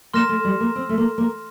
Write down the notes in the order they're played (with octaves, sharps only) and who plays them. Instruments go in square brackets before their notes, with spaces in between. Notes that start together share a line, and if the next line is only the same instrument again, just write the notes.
[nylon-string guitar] A#3 [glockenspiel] C6 F6 A#6 E7
[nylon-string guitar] A3
G3
A#3
C4
A3
A#3
A#3